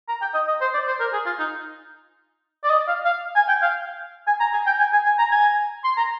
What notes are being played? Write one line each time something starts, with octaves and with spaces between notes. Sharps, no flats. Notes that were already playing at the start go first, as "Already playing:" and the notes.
A#5
G5
D#5
D#5
C5
D5
C5
A#4
G#4
F4
D#4
D5
D#5
F5
F5
G#5
G5
F5
G#5
A#5
G#5
G5
G#5
G#5
G#5
A#5
G#5
C6
A#5